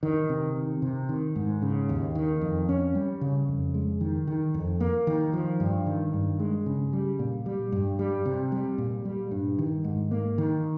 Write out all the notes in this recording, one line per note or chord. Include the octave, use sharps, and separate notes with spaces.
D#3
C3
D#3
C3
D#3
G#2
C#3
D#2
D#3
F2
C#4
G3
C#3
F2
G#3
D#3
D#3
F2
A#3
D#3
F3
G2
D#3
G2
G#3
C#3
G3
A#2
G3
G2
G3
C3
G3
A#2
G3
G2
D#3
G#2
A#3
D#3